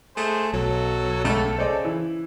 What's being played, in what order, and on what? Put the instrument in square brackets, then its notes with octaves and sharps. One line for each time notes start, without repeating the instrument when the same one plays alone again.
[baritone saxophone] A3 [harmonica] G#4 C5
[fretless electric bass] B1 [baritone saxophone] F#3 [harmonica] A4
[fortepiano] C#2 [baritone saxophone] A3
[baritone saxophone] C#3 [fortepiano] C5 D5 D#5
[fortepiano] E3